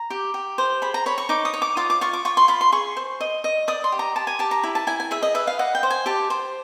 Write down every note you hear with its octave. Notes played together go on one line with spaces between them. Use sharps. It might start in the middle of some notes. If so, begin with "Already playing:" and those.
Already playing: A#5
G4
G4
C5
G#4 B5
A#5
C#5 B5
C#6
D#4 D6
D#6
C#5
D6
F4 D#6
D6
F4 C#6
D6
F4 C#6
C6
F4 B5
C6
G#4 C#6
C5
D#5
D#5
D5 D#6
C6
G4
A#5
G4 A5
G#5
G4 A5
A#5
E4
A5
E4 G#5
G#5
G#4 E5
D#5
B4 E5
F5
D#5 F#5
G5
C5
G#5
G4 A5
C5